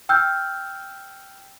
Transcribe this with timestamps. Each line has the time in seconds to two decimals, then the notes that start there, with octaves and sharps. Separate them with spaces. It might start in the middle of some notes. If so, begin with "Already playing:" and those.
0.09 G5 E6 F6 G6